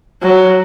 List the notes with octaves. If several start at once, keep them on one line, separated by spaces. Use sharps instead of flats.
F#3